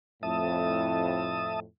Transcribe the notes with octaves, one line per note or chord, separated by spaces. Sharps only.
F2 A2 E5 A5 D#6